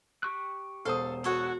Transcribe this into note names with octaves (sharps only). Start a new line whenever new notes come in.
G4 C#6 F#6
E1 A4 C5 F5 D#6
F#4 A4 C#5 F#5